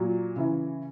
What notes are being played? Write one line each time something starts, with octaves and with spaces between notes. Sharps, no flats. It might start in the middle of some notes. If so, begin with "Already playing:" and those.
Already playing: A#2 F#3
C#3 E3